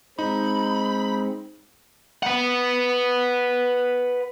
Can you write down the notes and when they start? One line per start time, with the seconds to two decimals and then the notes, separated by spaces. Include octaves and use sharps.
0.19 G#3 C4 D#4 B5
2.23 B4 F#5